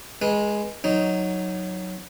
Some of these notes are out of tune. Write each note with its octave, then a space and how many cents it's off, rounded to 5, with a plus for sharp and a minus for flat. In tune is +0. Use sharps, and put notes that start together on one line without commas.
G#3 +0 B4 -30
F#3 +0 D#4 +0